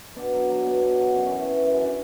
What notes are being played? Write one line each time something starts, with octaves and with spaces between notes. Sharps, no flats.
B2 D4
F#3
F#3
B2
B2
F#3
F#2 C#4
E3 C#4
E3 C#4
F#2 C#4
D4